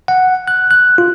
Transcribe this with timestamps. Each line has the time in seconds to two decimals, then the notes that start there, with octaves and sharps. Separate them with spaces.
0.08 F#5
0.48 F#6
0.71 F#6
0.98 F4